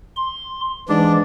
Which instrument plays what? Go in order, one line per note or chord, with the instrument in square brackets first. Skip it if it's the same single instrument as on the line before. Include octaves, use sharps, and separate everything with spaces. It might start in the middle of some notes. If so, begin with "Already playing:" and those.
[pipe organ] C6
[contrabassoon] G#2 [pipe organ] E3 [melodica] D4